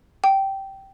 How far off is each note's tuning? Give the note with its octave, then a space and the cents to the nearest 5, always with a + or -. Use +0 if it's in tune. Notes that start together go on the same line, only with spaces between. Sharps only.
G5 -10